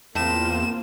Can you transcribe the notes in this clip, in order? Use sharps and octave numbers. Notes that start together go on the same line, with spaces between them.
E2 A2 A#3 C4 F4 E7